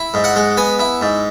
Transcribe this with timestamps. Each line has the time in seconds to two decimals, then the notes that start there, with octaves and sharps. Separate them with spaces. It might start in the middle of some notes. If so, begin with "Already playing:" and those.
Already playing: E4
0.14 G#2
0.24 F#5
0.36 G#3
0.57 B3 G#5
0.79 E4
1.01 G#2